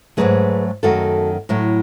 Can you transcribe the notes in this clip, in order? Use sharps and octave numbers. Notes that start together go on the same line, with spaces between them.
G#2 D#3 F#3 A3 G#4 B4
F#2 D#3 A3 F#4 A4
A2 F#3 A3